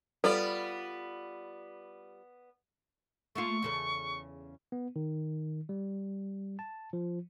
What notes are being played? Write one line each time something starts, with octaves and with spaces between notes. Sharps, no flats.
G3 B3 F4 A4 D5
A3 A#3 F4 C#6
E2 C#3 A4
B3
D#3
G3
A5
F3